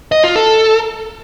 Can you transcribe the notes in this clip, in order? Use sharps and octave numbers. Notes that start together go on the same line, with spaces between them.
D#5
F4
A4